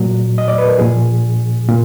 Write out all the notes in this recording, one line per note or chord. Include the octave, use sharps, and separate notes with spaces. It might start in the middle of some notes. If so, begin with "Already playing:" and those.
Already playing: A#2 F#3
D#5
D5
B4
A#4
A#2 F3 G#4
A#2